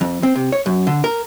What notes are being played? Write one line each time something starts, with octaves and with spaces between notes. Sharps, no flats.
F2
C4
C3
C#5
F#2
D3
A#4